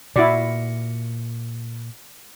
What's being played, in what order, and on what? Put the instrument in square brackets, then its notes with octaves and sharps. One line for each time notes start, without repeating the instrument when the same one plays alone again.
[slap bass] A#2 [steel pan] E4 F#4 D5